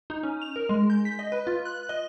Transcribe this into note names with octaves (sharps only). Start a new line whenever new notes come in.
D#4
C#4
F7
A#4
G#3
G6
B6
D#5
B4
F4
F#6
D#5